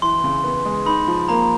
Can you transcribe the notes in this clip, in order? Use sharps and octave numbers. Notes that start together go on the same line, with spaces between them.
E3 C6
C#3
B3
G#3
D#4 B5
F3
A#3 A#5